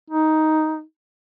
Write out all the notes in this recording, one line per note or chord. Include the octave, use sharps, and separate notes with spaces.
D#4